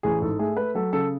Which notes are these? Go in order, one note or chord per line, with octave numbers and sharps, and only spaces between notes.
A1 G#4
G#2 A4
A3 G#4
A3 B4
F#3 A4
C#3 A4